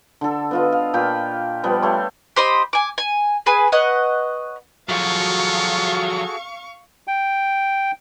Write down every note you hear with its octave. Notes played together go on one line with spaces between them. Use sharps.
D3 A4
B3 F4 D#5
F5
A#2 F4 G5 B5
F3 G3 B3
A3 G4 C#5 C6
G4 C5 D#5 B5
G#5 D6
G#5
G#4 B4 G#5
B4 C#5 D#5 F#5
F3 F#3 F4 F#4 G#4 A4 F5 C#6
G5